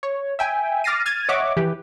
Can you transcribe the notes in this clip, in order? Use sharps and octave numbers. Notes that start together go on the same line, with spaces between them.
C#5
E5 G5 G#5
D6 F6 A6 A#6 C7 D#7
F6 G#6 A6 D#7
C#5 D#5 E5 F#5 C#6 D6
E3 G4 B4